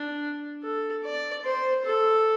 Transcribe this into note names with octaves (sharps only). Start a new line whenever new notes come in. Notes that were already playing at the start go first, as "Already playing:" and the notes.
Already playing: D4
A4
D5
C5
A4